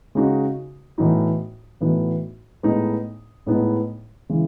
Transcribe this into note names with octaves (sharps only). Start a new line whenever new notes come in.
C#3 G#3 D#4 F#4
A2 E3 B3 D#4 F#4
A2 E3 B3 D#4 F#4
A2 G#3 B3 D#4
A2 G#3 B3 D#4
C#3 E3 G#3 C#4